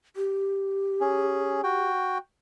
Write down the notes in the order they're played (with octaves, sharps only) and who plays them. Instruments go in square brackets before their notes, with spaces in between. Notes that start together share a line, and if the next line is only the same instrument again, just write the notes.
[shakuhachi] G4
[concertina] C#4 G#4
F#4 G5